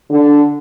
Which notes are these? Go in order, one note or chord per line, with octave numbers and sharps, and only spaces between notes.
D3